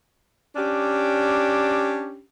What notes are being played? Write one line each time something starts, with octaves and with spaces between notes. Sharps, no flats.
C#4 D4 G4